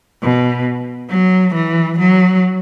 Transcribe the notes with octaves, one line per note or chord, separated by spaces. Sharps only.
B2
F#3
E3
F#3